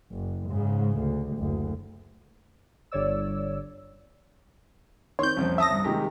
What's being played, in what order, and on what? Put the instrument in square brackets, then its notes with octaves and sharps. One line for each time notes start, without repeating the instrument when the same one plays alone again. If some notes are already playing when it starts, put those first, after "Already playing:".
[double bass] F#1
G#2 C#3
D2
F#1 D2
[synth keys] G1 C#5 D5 E6
[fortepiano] D#3 C4 [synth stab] C#5 G6 [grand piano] C6
[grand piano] C2 F2 [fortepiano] C4 C#4
[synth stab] E5 D#6 A#6 [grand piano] A5 E6
[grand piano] C2 G2
[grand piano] C3 D#3 G4 [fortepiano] G3 G#3